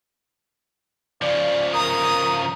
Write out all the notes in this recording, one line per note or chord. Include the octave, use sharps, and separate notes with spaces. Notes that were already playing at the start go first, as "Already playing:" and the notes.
C#3 F3 D5
A#4 A#5 D#6